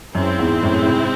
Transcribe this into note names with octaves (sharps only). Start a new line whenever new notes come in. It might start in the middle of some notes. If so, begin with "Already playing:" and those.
F#2 G#3 C4 E4
E2 G#2
F#2 A2
A2
G#2 C3